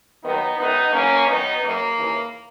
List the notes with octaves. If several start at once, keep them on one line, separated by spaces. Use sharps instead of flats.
D#2 D#3 F#3 B3 D#4
F#2 D#3 G#3 B3 D#4
E2 C#3 F#3 A#3 C#4
E2 D#3 F#3 B3 D#4
F#2 C#3 F#3 A#3
D#2 C#3 E3